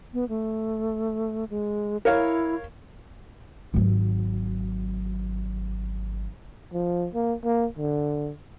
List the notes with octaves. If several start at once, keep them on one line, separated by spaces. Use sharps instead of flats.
B3
A3
G#3
E4 A#4 C#5 F5
G#1 F#3
F3
A#3
A#3
D3